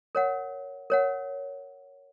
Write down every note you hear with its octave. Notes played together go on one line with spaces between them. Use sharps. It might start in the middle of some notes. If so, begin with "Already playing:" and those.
A#4 C#5 F#5
A#4 C#5 F#5